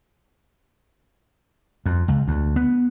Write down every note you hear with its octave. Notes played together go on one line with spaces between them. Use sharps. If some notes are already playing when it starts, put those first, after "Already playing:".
F2
C#2
D2
B3